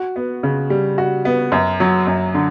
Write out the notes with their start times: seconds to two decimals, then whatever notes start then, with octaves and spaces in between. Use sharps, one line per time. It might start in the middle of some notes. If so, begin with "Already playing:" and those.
Already playing: F#4
0.16 B3
0.43 C#3
0.70 G3
0.98 F#4
1.25 B3
1.52 F#2
1.80 F#3
2.07 F#2
2.34 D3